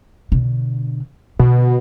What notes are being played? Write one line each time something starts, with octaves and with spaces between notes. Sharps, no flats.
B2 D3
B2 D3